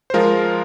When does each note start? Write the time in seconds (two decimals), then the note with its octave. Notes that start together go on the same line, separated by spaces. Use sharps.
0.10 C5
0.14 F3 G#3 F4 A#4